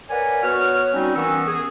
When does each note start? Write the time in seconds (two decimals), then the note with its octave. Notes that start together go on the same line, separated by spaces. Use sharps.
0.10 A#4 B4 C#5 D5 F#5 G#5
0.43 B3 F#4 B4 C#5 F6
0.93 G3 C4 C#4 D#4 F#4
1.15 E3 B3 C#4 A#4 C#6 E6
1.48 G#4